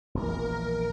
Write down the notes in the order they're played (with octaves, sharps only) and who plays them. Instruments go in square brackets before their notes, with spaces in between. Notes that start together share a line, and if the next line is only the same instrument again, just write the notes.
[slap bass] E1 A#1 [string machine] A#4